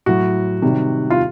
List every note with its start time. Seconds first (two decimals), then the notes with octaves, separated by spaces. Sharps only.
0.06 A2 F#3 F#4
0.62 C3 D#3 G3
1.10 F4